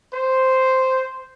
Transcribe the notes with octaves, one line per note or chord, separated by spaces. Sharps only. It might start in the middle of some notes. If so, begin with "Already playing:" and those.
C5